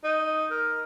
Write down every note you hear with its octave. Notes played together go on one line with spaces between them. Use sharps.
D#4
A#4